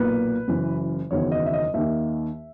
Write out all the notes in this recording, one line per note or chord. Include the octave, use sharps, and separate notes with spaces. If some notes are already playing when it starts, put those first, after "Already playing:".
Already playing: B1 A#2 A#3 B4
F#1 F#2 E3
F#1 E2 D#3 F#3 C#5
D#5
E5
D#5
D#2 D#3 A#3 E5